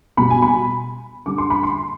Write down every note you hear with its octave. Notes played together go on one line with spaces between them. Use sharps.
B2 G3 B5
G#5
B5
D3 G3 D6
C6
B5
C6